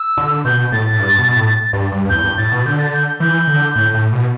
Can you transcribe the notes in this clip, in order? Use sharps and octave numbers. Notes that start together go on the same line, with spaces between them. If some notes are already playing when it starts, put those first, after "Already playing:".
Already playing: E6
D3
B2 G6
A2 A6
A2
G2
B2
A2
G2
G2
G2
E2 G6
G2
A2 A6
B2
D3 G6
A6
G6
G6
E3 G6
D3
A2
A2
B2